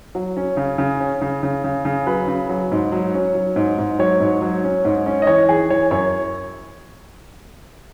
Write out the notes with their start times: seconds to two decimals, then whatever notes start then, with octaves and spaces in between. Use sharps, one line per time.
0.15 F#3
0.37 C#4
0.57 C#3
0.78 C#3
1.00 C#4
1.21 C#3
1.43 C#3
1.64 C#3
1.85 C#3
2.07 F#3 B4
2.28 C#3
2.49 F#3
2.72 G#2
2.92 F#3
3.14 C#4
3.34 F#3
3.56 G#2
3.78 G#2
3.99 F#3 C#5
4.20 G#2
4.42 F#3
4.64 C#4
4.85 G#2
5.06 C#4
5.22 D#5
5.27 E3 C#5
5.48 E3 G#4
5.70 E3 C#5
5.91 F#2 C#5